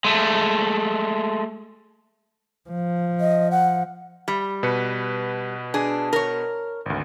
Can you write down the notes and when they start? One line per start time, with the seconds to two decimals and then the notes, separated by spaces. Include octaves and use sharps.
0.04 G#3 A3
2.69 F3
3.20 D#5
3.51 F#5
4.28 G3
4.63 B2 B4 C#7
5.74 D4 G#4
6.13 A#4 C#5
6.86 G#1 D2